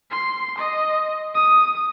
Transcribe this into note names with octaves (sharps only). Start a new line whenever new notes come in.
C6
D#5
D#6